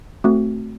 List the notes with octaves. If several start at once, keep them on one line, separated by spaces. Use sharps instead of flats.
A3 C4 F#4